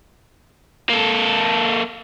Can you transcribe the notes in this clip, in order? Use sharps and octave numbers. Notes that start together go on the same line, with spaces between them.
A#3 A4